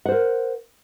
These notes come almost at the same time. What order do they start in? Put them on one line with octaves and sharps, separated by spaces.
F#5 C5 A#4